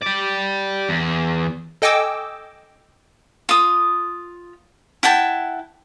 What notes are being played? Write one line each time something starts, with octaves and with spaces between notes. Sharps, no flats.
G4 D5
E2
A4 D#5 G5 G#5 D6 E6
F4 D#6
E4 F#5 G5 A5